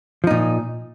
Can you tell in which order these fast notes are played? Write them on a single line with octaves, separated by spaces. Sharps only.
F3 D#4 A#2